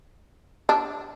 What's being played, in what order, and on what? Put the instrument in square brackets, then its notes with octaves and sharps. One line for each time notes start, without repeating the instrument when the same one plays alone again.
[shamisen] D4